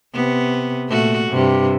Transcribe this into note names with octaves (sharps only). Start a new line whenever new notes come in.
C3 B3
A#2 A3 F#4
G2 C3